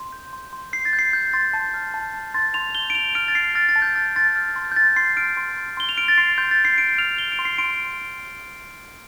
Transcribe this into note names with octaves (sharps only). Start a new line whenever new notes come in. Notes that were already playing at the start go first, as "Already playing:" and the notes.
Already playing: C6
G6
C6
C6
G6 C7
A6
G6
C7
G6
C6 A6
A5
F6
A5
A5
C6 A6
C6 F7
G6 G7
D7
G6 F7
F6 D7
A6
F6 C7
F6 A6
A6
A5
G6
F6 A6
C6 A6
F6
C6
G6
F6 A6
C6 C7
F6 D7
C6
C6
C6 G7
F7
F6 D7
A6
C6 C7
C6 G6
A6
C6
C7
C6 D7
F6 F7
G6 G7
D7
C6
C7
C6 D7